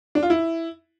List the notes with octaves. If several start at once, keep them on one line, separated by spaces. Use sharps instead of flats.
D4
F4
E4